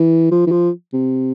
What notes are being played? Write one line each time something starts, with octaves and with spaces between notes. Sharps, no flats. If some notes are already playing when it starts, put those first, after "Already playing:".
Already playing: E3
F3
E3
F3
C3